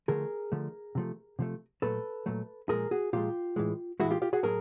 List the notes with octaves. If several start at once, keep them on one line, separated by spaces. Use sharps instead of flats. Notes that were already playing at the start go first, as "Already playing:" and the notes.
D3 F3 A3 G#4 A#4
D3 F3 A3
C3 F3 A3
C3 F3 A3
A#2 F#3 A3 A4 B4
A#2 F#3 A3
A#2 F3 G#3 G#4 A#4
F#4 G#4
A#2 F3 G#3 F4 G4
A2 E3 G#3
A2 E3 G#3 E4 F#4
F4 G4
F4 G4
F#4 G#4
A2 F#3 G#4 A#4